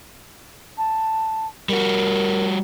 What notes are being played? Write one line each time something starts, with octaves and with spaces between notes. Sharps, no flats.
A5
G3 F#4 A#4